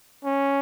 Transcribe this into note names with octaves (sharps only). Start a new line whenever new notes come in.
C#4